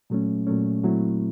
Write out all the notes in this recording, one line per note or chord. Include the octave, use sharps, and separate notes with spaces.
A#2 F#3 A3 C#4
A#2 F#3 A3 C#4
A#2 F#3 A3 C4 E4